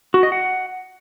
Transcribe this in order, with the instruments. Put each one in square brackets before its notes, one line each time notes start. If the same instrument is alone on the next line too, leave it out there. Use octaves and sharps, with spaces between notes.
[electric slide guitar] F#4
D#5
F#5